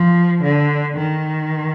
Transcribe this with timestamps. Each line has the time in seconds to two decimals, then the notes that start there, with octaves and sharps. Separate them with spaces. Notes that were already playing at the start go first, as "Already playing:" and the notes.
Already playing: F3
0.43 D3
0.97 D#3